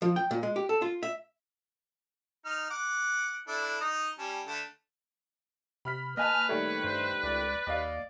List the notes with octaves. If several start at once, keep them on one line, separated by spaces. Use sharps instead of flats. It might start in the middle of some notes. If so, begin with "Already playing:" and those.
F3
G5
A#2
G#3
G4
A4
F4
E5
D#4 F6
F#5 D6
D4 E4 A4
D#4 D#5
G3 C#4 A5
D3 A3 A5
C3 B5 F6 B6
A#3 B4 D#5 G#5 A5 F6
D#3 G3 A3 C#5
G2 C5
C#2 D5
D#2 D5 D#5 F5